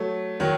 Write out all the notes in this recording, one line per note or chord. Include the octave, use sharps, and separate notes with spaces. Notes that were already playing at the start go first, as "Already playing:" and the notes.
Already playing: F#3 A3
D#3 F#3